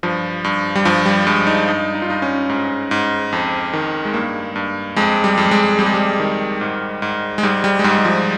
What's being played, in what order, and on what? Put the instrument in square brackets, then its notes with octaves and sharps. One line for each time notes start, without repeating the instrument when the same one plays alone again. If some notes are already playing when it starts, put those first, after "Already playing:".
[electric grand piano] G2 F3
G2
G3
G2 F3
G3
G2 G#3
D#4
G2 D#4
D#4
F4
G2 D#4
C#4
G#2
G#2
F2
D#3
G#3
G2 A#3
G2
F2 G#3
G3
F2
G3
G#3
F2 G3
G#3
G3
D#3
G#2
G#2
G#3
G#2 G3
G3
G#3
G#2 G3
G3
F3